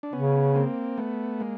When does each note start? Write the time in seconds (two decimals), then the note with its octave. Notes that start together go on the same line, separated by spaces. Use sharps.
0.03 D4
0.13 C#3 B3 C#4
0.55 A#3 C4
0.98 A3 B3
1.40 G#3 A#3